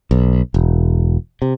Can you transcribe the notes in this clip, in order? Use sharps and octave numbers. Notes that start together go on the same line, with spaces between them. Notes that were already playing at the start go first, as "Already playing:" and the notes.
B1
E1
C3